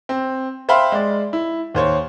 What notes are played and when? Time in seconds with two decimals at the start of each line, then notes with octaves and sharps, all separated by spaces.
0.09 C4
0.69 C5 E5 F5 G5 B5 C6
0.92 G#3 D5
1.33 E4
1.75 D#2 C5 C#5